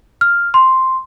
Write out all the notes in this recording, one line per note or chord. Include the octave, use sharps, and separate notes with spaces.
F6
C6